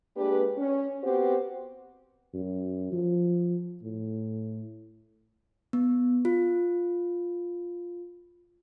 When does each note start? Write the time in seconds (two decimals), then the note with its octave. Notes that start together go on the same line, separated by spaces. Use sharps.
0.17 G#3 A#3 D4 G4 B4
0.57 C#4
1.03 B3 C4 F#4 G4 C5
2.34 F#2
2.92 F3
3.82 A2
5.73 B3
6.25 F4